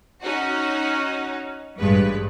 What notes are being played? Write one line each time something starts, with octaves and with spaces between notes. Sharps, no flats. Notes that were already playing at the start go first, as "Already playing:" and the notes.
C#4 D#4 F#4
A1 G2 G#3 B4